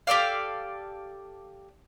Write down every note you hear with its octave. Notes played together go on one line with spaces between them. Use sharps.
G4 A4 D5 F5